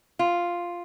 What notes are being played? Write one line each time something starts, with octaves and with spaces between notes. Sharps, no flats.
F4